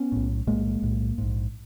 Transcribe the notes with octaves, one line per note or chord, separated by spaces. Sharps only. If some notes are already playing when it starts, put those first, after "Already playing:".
Already playing: B3 C#4
B1 A2
B1 A2 G#3 A#3
B1 A2
A#1 G#2